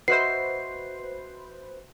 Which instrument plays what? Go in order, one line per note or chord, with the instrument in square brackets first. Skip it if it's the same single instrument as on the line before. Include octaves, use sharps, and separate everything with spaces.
[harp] F#4 D#5 E5 [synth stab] B4 C5 [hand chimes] C7